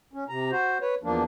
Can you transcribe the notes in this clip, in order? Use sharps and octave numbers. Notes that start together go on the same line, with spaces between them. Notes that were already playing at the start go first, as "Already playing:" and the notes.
C#4
C3 A#5
F#4 C5
B4 C#5
E2 F3 A#3 D4